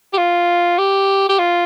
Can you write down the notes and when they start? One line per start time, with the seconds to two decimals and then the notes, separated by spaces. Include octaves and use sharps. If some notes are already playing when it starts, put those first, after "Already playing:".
0.13 G4
0.18 F4
0.78 G4
1.29 G4
1.39 F4